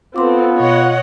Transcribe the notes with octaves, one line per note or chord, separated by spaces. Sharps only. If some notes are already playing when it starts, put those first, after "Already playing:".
B3 C4 F4 A4 B4 C6 D6
B2 C#5 D#5 F#5